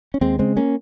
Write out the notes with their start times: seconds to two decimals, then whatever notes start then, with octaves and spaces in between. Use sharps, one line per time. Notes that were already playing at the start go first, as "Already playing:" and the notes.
0.14 C#4
0.21 D#2 G#3 C4
0.39 C#3 G#3 C4
0.57 A#3 C#4